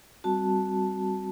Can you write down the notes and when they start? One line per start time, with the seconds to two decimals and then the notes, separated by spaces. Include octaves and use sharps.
0.24 G3 C4 F#4 A5